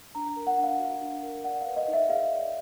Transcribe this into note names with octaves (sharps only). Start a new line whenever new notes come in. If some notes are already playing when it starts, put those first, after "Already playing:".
D4 A#5
A#4
F#5
D4
F5
F#4
D4
A#4
D5 F#5
F5
B4
D#5
D#4
E5
G#4 F5
D5